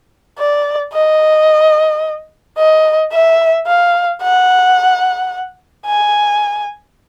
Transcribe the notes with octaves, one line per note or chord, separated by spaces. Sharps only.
D5
D#5
D#5
E5
F5
F#5
G#5